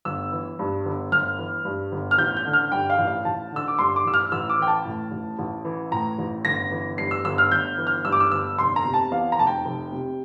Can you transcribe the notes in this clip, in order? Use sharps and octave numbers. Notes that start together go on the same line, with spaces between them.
G1 E6
E3
G2
G1
G1 F6
E3
G2
G1
F6
A1 G6
G6
D3
F6
G2 G5
F5
A1
F5
A1 A5
D3 E6
D6
G2 C6
D6
A1 E6
F6
A1 E6
D6
E3 G5
A5
A2
A1
A1
E3
A2 A#5
A1
G1 A#6
E3
G2 C7
E6
G1 E6
F6
G1 G6
E3
F6
G2 E6
D6
E6
G1 E6
F1 C6
A#5
C3
A5
E2 F5
A#5
F1 A5
G5
F1
C3